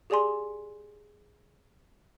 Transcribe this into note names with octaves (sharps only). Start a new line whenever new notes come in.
G4 G#4 D5 G#5 C6